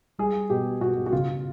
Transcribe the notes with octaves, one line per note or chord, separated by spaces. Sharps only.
G3 G#4
B2 G4
B2 F#4
F#4
C#3 F4